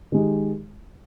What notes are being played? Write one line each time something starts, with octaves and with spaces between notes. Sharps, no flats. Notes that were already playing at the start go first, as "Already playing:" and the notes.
D#3 G#3 D#4 G4